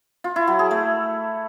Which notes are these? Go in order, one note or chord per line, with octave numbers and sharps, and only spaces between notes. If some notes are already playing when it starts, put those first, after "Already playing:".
F4
E4
F#3
G#4
A3